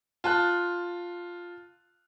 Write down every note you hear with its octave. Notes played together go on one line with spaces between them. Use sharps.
F4 A5 F#6